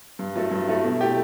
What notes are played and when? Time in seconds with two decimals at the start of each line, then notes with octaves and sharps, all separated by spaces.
0.19 G2
0.35 F#3 A3 E4 A4
0.51 G2
0.68 F#3 A3 E4 A4
0.84 B2
1.01 A3 E4 G4